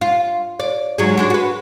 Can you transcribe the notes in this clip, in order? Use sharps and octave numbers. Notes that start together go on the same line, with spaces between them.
F4
D5
G#2 F#3 G#4
G#3 D4 F#4
F#4 B4